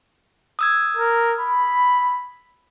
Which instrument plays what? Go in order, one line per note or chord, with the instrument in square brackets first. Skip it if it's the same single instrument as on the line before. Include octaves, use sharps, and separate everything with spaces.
[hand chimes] D#6 E6 G#6
[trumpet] A#4
B5